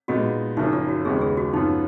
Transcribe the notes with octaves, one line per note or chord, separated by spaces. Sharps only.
A#2 G#3 B3 D#4 F#4
F#1 F#2 F3 A#3 D#4
F4
F#4
D#2 C#3 G#3 B3 G#4
G#4
F#4
F#2 F3 B3 D#4 F4